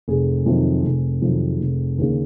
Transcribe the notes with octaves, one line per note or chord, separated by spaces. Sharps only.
F1 G#4
F2 C3 D#3 F#3
F1
F2 C3 D#3 F#3
F1
D#2 C#3